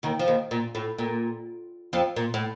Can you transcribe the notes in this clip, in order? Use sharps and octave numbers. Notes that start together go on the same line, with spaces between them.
D#2 D#3
F3
D#2 D#3
A#2
A2
A#2
F2 F3
A#2
A2